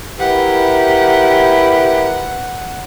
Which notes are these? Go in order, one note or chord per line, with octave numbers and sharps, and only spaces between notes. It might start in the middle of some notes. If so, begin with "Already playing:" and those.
E4 G4 A#4 B4 F#5